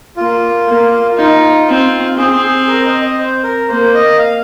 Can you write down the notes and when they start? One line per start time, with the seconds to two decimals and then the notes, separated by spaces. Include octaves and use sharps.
0.17 A#3 F4
0.68 A#3
1.17 D#4 F4
1.68 C4
2.17 C4 G#4
2.44 G#4
2.63 G#4
2.68 A#4
2.81 C5
2.85 D#5
3.02 D#5
3.19 C5
3.43 A#4
3.68 A#3 C5
3.94 D#5
4.19 F5